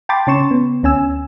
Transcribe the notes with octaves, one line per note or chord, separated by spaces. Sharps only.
G5 A5 B5 C6 D6 A6
C#3 C#4 C6 C#6 E7
B3
D2 C#4 G#5 E6